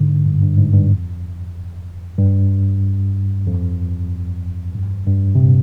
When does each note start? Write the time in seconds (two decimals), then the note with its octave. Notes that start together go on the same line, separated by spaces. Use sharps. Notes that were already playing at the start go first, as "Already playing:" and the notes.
Already playing: G#2 D3
0.26 G2
0.42 G2
0.58 G#2
0.73 G2
0.90 F2
2.18 G2
3.47 F2
4.75 G2
5.07 G2
5.35 C3
5.39 A#2